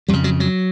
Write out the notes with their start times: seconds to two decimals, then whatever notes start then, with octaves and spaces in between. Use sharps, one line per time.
0.08 F2 C#3 G3
0.24 F#3
0.40 F#3